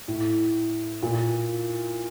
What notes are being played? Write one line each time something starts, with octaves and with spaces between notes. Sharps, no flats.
A2
A#2